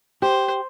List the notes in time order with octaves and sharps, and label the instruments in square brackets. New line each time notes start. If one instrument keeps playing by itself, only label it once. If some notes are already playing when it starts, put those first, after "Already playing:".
[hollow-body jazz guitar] G4 [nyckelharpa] C5